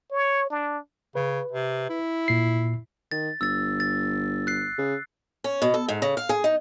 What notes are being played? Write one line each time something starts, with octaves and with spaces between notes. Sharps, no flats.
C#5
D4
C#3 B4
C3
E4
A#2 C7
D#3 A6
G1 E6 A6
A6
F#6 C7
C#3
C#4
B2
A4
G#2
C#3
F5
G#4
D#4